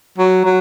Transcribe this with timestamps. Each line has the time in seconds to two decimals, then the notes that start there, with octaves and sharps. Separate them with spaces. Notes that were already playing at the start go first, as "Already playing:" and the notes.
0.19 F#3
0.45 F#3